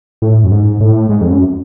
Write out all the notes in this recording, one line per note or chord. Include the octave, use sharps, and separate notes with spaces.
A2
F#2
G#2
A2
G#2
F2
F#2